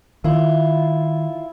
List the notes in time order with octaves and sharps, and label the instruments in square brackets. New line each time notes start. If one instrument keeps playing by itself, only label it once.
[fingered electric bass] D#3 [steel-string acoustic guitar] E4 F4